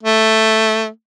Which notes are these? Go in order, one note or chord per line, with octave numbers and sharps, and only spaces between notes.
A3